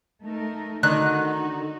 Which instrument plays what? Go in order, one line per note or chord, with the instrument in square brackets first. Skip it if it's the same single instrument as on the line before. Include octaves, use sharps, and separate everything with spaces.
[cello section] A3 D#4 A#4
[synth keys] D3 [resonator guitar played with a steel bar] D#3 [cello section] D#4 F#4 [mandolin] F#6